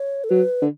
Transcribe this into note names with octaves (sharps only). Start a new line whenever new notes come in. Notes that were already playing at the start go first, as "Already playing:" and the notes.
Already playing: C#5
A4
F#3 B4
D3